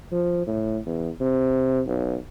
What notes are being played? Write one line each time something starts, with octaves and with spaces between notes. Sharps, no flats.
F3
A2
E2
C3
B1